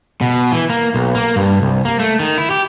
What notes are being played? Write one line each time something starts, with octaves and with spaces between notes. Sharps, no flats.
B2
E3
A#3
B1
A#3
G2
C2
A#3
A3
D#3
E4
G4